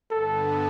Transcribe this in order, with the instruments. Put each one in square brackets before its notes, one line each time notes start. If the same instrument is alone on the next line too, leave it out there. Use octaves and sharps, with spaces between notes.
[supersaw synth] G2 D3 B3 [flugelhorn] A4